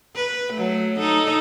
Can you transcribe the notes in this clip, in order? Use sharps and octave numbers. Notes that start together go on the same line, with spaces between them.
B4
F#3 A3
D#4 A4